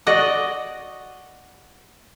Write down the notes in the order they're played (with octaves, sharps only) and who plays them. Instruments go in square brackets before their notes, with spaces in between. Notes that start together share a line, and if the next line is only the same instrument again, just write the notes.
[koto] F#4 D5 D#5 F#5